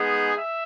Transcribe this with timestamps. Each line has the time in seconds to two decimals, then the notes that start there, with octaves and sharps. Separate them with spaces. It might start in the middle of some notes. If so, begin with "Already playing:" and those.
Already playing: G#3 B3 D#4 G#4
0.35 E5